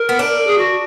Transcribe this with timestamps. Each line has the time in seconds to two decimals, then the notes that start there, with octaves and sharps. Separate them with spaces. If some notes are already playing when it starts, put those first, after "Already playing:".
Already playing: A#4
0.09 B3
0.19 D4
0.47 G#4
0.58 F#4